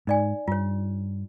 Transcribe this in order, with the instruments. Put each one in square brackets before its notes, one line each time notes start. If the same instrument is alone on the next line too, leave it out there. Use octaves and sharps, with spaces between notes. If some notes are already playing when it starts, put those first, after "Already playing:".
[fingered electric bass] G#2 [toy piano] D#4 D5 G#5
[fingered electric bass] G2 [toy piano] F4 C#5